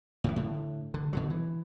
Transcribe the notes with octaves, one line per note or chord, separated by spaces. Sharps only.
A2 C#3 E3
A2 D3
D3
B2 D3 F#3
E3